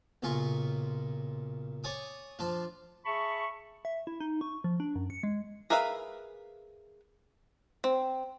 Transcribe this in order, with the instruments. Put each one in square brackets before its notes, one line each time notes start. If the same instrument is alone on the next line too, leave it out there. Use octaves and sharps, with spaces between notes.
[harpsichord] B1 A#2 C#3 F4 G#5 C#6
C#5 D5 G#5 D6 D#6
F3 D4 F4
[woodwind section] G#4 E5 A5 B5 C#6
[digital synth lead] E5
E4
D#4
C#6
F3
D4
F#2
C#7
G#3
[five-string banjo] G#4 A#4 B4 E5 F5
C4